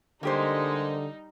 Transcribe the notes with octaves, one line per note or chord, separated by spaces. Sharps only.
D3 G3 G#3 A#3 D#4 G4 C5